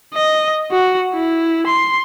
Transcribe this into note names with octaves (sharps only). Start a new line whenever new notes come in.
D#5
F#4
E4
C6